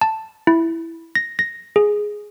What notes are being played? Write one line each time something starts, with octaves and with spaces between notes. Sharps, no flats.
A5
E4
A#6
A#6
G#4